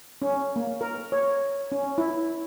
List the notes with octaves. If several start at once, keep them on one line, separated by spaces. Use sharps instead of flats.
C#4
A#3
A#4
C#5
C#4
E4